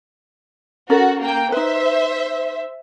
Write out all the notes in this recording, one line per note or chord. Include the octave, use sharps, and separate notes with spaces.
C#4 F#4 A4 A#4
A#3 G5
D#4 B4 C5 E5